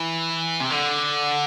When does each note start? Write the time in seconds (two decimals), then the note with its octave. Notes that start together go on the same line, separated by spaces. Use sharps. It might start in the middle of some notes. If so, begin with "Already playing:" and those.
Already playing: E3
0.61 C3
0.71 D3